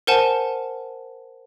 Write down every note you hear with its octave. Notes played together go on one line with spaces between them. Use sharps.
A#4 C5 F#5 G#5 A5